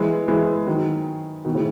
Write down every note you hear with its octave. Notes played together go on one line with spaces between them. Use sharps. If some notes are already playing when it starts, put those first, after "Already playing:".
Already playing: E3 G#3
E3 G#3
D#3 F#3
B2 D#3
A2 C#3